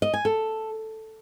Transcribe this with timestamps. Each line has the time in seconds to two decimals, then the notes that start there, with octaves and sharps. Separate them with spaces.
0.02 D#5
0.14 G#5
0.25 A4